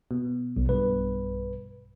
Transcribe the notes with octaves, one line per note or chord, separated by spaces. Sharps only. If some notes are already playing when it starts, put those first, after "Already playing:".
B2
B1
B1 G2 B2 B4